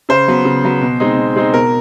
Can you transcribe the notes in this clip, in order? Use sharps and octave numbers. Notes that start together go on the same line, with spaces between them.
C#3 C5
F#3 B3
C#3
F#3 B3
B2
G#3 C4 D#4
B2
G#3 C4 D#4
B2 A#4